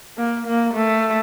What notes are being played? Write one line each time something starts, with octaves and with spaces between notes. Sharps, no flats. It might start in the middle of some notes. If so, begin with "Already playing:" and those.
A#3
A#3
A3